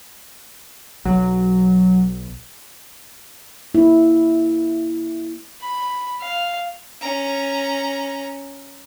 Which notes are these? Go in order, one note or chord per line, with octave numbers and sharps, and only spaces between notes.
B1 F#3
A#3 E4
B5
F5
C#4 A#5